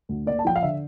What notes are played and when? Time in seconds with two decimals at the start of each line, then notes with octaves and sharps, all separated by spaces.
0.09 D2
0.26 A#3 D5
0.39 A5
0.45 F3 G5
0.56 F5
0.63 D3 E5